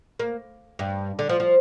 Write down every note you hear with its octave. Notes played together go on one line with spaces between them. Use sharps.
A#3
G2
D3
F3
F3